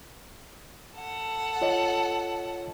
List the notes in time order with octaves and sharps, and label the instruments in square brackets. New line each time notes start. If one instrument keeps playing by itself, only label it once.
[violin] A4 F#5
[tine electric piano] F4 C#5 D#5